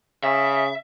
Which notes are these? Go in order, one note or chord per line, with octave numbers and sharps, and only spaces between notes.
C#3 E5